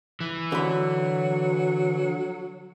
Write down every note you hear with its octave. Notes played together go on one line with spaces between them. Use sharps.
E3
D3 F#3 B5